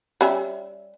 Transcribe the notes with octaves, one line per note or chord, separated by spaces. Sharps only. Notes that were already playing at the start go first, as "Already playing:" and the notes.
G3 C#4 E5